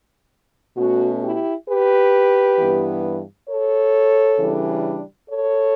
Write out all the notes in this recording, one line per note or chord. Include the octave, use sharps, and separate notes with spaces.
B2 A3 C#4 F#4
E4 G4
G4 B4
G2 E3 B3
A4 C#5
C#3 E3 G3 D4
A4 C#5